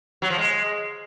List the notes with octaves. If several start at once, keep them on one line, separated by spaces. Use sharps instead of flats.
F#3
F3
G#3